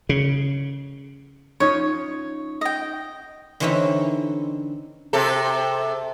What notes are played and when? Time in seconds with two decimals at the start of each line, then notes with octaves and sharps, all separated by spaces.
0.09 C#3
1.60 C#4 D#4 F4 C#5
2.61 D#5 G5
3.60 D3 E3 C4 C#4 D#4 E4
5.13 C3 A4